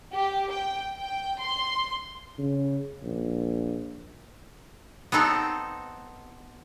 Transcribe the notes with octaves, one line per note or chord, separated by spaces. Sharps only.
G4
G5
G5
C6
C#3
A#1
B3 C4 D#4 A4